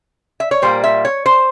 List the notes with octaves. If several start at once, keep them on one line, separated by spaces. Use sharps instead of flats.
E5
C#5
A#2 G3 A#3 C5
E5
C#5
C5